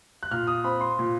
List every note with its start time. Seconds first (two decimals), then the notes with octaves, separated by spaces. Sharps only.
0.23 F#6
0.31 A#2 F6
0.47 D#6
0.64 C4 B5
0.81 C6
0.99 A#2